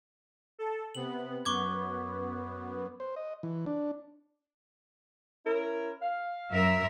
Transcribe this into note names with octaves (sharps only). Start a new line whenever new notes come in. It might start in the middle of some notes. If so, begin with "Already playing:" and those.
A4
C3 B3 F#7
F#2 B3 C#6 D6 G#6
C5
D#5
E3
D4
C#4 E4 A#4
F5
F#2 A#4 E5